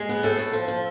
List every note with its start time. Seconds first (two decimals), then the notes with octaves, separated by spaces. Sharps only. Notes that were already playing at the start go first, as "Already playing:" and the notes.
Already playing: G#3
0.09 B3
0.23 A2 A4
0.39 A2
0.53 F3
0.68 F3